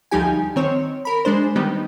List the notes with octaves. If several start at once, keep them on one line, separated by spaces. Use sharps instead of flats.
D2 F3 G3 D#4 G4 G#5
D#3 C4 C#5
A#4 B5
G#3 D4 C5
D#3 G3 B3 D#4